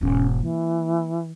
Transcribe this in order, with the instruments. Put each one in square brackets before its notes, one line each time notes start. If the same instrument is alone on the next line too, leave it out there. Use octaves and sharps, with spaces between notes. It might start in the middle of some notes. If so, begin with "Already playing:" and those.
[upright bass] E1 G#2 [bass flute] C#4
[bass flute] E3 [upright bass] A#3